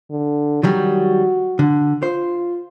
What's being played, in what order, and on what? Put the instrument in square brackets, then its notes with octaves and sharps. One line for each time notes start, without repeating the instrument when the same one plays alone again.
[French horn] D3
[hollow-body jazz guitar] D#3 F#3 G3 [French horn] F#4
[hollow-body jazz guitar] D3
[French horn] F4 [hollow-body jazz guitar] C5